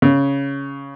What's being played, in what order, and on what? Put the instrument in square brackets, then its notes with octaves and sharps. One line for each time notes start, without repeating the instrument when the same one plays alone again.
[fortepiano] C#3